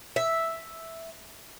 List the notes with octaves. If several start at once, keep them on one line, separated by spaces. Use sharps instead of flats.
E5